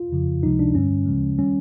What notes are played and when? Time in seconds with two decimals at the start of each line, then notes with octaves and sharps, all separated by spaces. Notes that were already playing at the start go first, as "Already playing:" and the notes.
Already playing: F4
0.12 F2 C#3 F3
0.43 C#2 C3 F3 G#3 D#4
0.59 D4
0.75 G2 D3 G3 C#4
1.06 D2 C#3 F3 G#3
1.39 D#3 G3 C#4